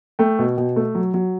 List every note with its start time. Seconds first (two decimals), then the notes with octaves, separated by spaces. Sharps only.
0.19 A3 G5
0.39 B2
0.58 B2
0.76 A3
0.95 F#3
1.14 F#3